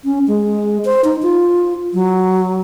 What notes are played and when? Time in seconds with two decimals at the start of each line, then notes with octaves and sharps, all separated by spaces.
0.05 C#4
0.27 G#3
0.85 C5
1.04 D#4
1.23 F4
1.94 F#3